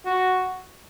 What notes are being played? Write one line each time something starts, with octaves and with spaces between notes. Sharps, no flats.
F#4